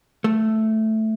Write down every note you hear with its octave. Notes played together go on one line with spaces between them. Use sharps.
A3